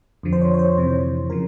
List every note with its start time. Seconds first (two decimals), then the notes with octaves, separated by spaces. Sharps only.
0.23 F2 D3 F3
0.33 C5
0.41 C#5
0.54 C#5
0.59 C5
0.77 F2 C3 E3
1.30 C#3 F3 A#4